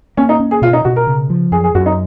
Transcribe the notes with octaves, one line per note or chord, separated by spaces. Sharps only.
A#3 C#4
D#4
C#4
G#4
B2 F4
D#4
B2 F#4
A#4
C#3
F3
F#2 G#4
G#4
F#2 F#4
D#4